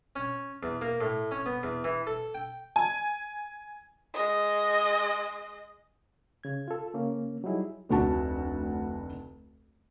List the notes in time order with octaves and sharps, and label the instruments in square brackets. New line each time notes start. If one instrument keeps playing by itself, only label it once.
[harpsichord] C#4
E2
A#3
A2
C#4
B3
E2
E3
A4
G5
[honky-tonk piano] G#5
[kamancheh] G#3 D#5
[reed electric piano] C#3 G#6
F4 A4
C#3 A#3 C#4
F#3 G3 D#4 E4 G#4
[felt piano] F1 D2 F#4 A5